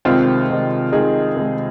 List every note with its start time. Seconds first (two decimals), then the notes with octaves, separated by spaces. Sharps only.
0.05 C2 C3 D#3 G#3 C4 F4
0.49 C2 C3 D#3 G#3
0.92 C2 C3 D#3 G#3 D#4 G#4
1.36 C2 C3 D#3 G#3